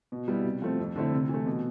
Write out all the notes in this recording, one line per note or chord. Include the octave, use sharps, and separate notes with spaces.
B2
G3 B3 E4
C3
F3 A3 C4
F2
D3 A3 C4 E4
C3
E3 A3
B2